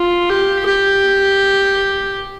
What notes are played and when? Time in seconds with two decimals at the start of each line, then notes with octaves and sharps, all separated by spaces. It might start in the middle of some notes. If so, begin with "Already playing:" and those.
Already playing: F4
0.30 G4
0.65 G4